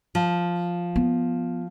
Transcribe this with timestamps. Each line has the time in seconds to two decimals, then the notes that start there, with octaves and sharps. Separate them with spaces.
0.15 F3
0.96 B3